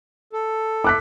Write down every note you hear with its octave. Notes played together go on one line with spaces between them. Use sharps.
A4
D6 F#6 B6